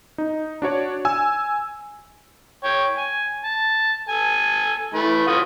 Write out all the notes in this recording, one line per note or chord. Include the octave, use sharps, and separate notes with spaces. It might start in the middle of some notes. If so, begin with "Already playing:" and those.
D#4
D4 F#4 C#5 D5
G#5 E6
C#5 G5
G#5
A5
A4 G#5
E3 A3 B5
F4 F#4 D#6